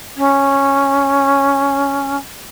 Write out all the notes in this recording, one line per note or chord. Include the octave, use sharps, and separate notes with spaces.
C#4